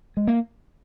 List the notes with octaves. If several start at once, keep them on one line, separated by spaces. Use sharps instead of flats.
G#3
A#3